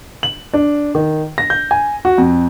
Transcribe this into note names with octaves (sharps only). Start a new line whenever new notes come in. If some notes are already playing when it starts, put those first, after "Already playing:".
F#7
D4
D#3
A#6
G6
G#5
F#4
F2